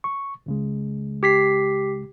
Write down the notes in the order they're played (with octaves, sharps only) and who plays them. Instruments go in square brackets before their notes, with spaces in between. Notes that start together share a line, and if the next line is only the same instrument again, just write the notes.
[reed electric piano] C#6
C#2 C#3 G#3
[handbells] G4 B6 C7